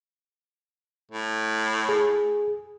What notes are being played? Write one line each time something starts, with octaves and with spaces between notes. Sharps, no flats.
A2
G#4